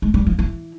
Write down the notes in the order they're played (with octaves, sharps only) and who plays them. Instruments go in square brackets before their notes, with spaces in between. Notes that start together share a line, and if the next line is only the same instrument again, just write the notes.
[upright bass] G#3
G3
F3
E3